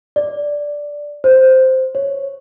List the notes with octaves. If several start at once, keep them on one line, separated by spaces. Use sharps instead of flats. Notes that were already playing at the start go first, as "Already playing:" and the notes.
D5
C5
C#5